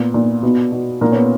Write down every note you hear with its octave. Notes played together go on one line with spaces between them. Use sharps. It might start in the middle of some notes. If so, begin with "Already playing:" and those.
Already playing: A#2 B3
A#2
B2 B3
B2
A#2 A#3
C#4
B3